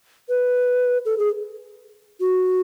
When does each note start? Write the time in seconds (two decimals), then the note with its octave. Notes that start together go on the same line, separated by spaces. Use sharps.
0.29 B4
1.05 A4
1.18 G#4
2.20 F#4